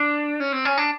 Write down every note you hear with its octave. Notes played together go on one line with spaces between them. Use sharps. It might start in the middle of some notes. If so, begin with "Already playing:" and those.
Already playing: D4
C#4
C4
C#4
D4